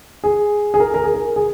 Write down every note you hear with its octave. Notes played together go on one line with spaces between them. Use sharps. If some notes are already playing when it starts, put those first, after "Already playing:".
G#4
G#4
A#4
A#4
G#4
A#4
G#4